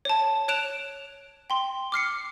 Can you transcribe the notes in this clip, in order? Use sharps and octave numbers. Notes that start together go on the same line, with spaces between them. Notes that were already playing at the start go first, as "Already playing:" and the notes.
C#5 A5
C#5 F#6 D7 E7 F7
G5 C6
D6 F6 C7 C#7